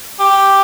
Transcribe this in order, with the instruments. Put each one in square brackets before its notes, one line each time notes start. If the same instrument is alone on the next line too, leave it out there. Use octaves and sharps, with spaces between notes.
[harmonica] G4